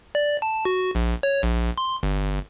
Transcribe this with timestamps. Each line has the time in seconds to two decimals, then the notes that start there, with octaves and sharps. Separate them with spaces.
0.15 D5
0.42 A5
0.65 F#4
0.95 A#1
1.23 C#5
1.43 A#1
1.78 C6
2.03 G1